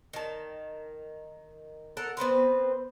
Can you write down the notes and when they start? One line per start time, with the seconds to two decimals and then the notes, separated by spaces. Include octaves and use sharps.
0.13 D#3 A5
1.97 A4 A#4 F#5
2.17 B3 C4 B4 C5